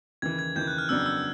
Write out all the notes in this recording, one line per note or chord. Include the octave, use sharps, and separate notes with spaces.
D#2 C#3 E3 G#6
G#6
D#2 C#3 E3 G6
F#6
F6
F2 C#3 F#3 B3 D4 E6
E6